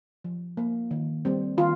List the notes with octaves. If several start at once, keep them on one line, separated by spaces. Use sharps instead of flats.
F3
A#3
D#3
G3 C4
D#3 F4